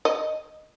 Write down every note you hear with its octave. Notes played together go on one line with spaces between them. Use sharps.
D#5